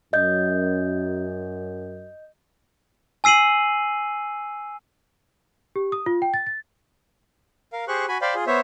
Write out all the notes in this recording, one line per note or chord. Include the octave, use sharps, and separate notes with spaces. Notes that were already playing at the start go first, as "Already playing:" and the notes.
F#2 D#5 G6
G#5 E6 C7 D#7 F#7
G4
D#6
F4
G5
A6
A6
A#4 F5
G4 G#4 C5 C#6 F#6
F#4 G#5 B5
C5 D5 F5 G5 B5
F4 G#4
B3 C5 C#5 E5